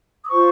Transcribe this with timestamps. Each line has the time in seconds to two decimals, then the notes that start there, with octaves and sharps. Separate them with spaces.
0.24 D#6
0.28 F4 C5 C#6